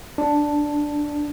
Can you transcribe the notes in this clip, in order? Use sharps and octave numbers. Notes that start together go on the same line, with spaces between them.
D4